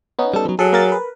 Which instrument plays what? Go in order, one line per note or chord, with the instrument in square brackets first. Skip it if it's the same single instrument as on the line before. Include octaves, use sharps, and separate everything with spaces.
[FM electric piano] B3 C#4 D#4
[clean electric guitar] G3 A4
F3 F#3
[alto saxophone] F#3 [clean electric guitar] G#4 [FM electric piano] A4
[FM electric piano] A#3 A#4 A6
A#4 B4